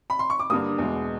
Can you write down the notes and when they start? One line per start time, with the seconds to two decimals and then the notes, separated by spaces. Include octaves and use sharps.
0.10 B5
0.19 C6
0.30 C#6
0.39 D6
0.50 G2 D3 G3 A#3 D#6
0.78 E2 B2 G#3